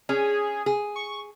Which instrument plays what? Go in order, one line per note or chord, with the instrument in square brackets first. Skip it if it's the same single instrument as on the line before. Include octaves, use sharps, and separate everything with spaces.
[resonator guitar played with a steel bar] C#4 [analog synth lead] G#4
[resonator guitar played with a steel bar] G#4
[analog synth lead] C#6